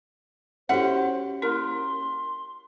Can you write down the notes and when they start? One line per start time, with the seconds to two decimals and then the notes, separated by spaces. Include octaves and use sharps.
0.69 C#4 E4 F#4 G4 A4 C5 E5 F#5
1.42 A#3 E4 A#4 C6